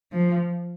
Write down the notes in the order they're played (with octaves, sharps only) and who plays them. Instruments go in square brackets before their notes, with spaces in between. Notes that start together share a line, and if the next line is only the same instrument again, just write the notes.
[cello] F3